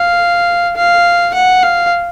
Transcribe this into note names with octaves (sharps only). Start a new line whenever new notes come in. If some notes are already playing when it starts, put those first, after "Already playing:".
Already playing: F5
F5
F#5
F5